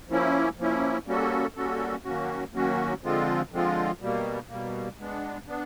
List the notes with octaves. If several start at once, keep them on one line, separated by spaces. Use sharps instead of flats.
F3 A#3 C#4 E4
F3 A#3 C#4 E4
G3 A#3 C#4 F#4 A4
G3 A#3 C#4 F#4 A4
D#3 F#3 A#3 C#4 F#4
D#3 F#3 A#3 C#4 F#4
D3 F3 G#3 C4 F4
D3 F3 G#3 C4 F4
B2 G3 A#3
B2 G3 A#3
G#3 B3 D4
B3 D4